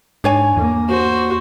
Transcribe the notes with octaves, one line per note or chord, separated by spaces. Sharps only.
G#2 D4 C#5 G#5
E2 A#3
F#4 C5